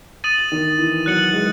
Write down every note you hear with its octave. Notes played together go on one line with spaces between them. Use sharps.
D#6 A6 D#7 F#7
D#3
E3
F#3 F#6 C#7 F#7
G#3